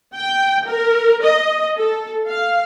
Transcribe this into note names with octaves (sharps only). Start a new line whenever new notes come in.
G5
A#4
D#5
A4
F5